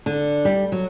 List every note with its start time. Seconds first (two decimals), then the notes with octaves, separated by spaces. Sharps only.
0.06 D3
0.45 G3
0.72 F#3